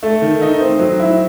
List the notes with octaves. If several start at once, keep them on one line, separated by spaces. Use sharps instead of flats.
A3
D#3
D#4
C4
F#3
E4